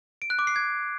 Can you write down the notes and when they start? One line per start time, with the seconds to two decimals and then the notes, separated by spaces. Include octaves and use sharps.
0.22 D7
0.30 F#6
0.39 D6
0.47 C7
0.56 G#6